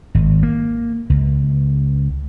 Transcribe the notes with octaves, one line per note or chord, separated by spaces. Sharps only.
G#1
A#3
C#2